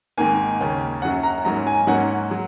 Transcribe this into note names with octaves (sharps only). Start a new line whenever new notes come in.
G#1 G#2 D#3 A#3 G#5
D#2 C#3 A#3 C#4
F#2 F#3 C#4 F#5
A#5
G#2 F#3 A#3 C#4 A#5
G#5
G#2 F#3 A#3 C#4 F#5
F#3